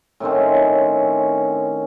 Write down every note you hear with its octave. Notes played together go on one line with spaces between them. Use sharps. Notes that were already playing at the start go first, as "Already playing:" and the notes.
A2 D#3 C4 C#4